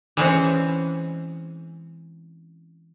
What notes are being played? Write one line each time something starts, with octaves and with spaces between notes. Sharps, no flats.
E3 G#3 C4 C#4